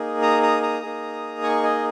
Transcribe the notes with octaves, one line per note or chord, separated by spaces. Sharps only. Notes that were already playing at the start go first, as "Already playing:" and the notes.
Already playing: A#3 D#4 G#4
A#5 D#6
A#5 D#6
A#5 D#6
A#3 D#4 G#4
G#5 C#6
D#5 G#5